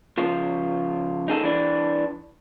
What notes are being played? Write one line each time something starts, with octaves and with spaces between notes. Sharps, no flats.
C#3 F3 F4
D#4 G#4 A4
E3 D4